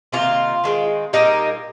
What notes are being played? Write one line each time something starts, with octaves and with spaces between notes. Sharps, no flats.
C3 D#3 A#3 C#4 F4
D#3 G#3 C4
A#2 G3 A#3 D#4 G4